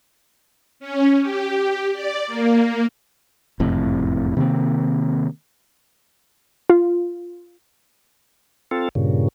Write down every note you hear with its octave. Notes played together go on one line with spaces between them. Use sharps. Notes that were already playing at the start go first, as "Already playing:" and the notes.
C#4
G4
D5
A#3
F#1 F2 A2 C3
C3 D#3 A#3 C4
F4
C4 F4 A4
G2 A#2 C#3